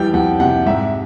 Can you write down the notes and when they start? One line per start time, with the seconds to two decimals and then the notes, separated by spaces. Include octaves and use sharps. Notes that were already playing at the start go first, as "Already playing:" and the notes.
Already playing: F2 E3 G3 G5
0.13 F2 F#5
0.40 C3 F#5
0.66 G#2 E5